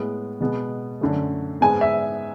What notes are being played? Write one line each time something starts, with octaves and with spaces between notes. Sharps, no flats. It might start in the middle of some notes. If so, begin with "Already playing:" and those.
Already playing: A2 G#3 B3
B2 G#3 B3
F#2 D3 A3
G#2 G#3 B3 G#5
E5